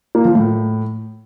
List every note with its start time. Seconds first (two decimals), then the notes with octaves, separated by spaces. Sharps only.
0.15 A#3
0.25 F3
0.35 A2